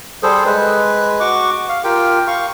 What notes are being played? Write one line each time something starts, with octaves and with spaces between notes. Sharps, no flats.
G3 G#4 A4 C5
G#3 B4
F#4 C#6 D6
F5
F4 G4 A#4 G5
F5 C#6